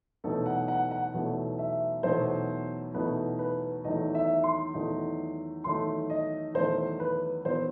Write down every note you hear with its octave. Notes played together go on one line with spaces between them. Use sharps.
E2 B2 F#3 A3 D#4 A4
F#5
F#5
F#5
E2 B2 F#3 A3 D#4
E5
E2 B2 F#3 A3 D#4 C5
E2 B2 F#3 A3 D#4 B4
B4
E2 D#3 F#3 A3 D#4 D#5
E5
C6
E2 D#3 F#3 A3 D#4
E2 D#3 F#3 A3 D#4 C6
D#5
E2 D#3 F#3 A3 D#4 C5
B4
E2 D#3 F#3 B3 C5